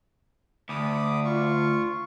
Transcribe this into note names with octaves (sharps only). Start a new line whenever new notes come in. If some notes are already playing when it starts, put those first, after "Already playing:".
D2 B5 D6 D#6
F4 C#6